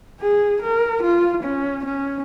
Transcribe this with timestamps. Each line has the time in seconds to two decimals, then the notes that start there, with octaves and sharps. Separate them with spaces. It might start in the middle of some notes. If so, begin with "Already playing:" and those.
0.21 G#4
0.62 A#4
1.02 F4
1.43 C#4
1.85 C#4